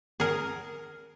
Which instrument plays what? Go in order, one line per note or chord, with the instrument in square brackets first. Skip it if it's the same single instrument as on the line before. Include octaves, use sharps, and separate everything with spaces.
[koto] G#4 A#4